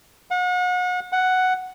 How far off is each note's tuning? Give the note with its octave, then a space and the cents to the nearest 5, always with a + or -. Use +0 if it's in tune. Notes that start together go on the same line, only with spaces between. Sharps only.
F#5 -35
F#5 +5